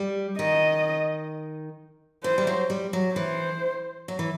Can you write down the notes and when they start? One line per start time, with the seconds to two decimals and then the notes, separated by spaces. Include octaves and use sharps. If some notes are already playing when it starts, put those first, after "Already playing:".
Already playing: G3
0.39 D#3 D#5
2.24 E3 C5
2.38 G3
2.47 F#3
2.70 G3
2.93 F#3
3.16 E3 C5
4.08 F#3
4.19 E3